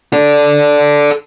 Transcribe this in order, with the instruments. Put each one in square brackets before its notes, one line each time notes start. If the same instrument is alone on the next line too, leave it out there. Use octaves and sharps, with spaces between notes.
[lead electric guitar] A4 D5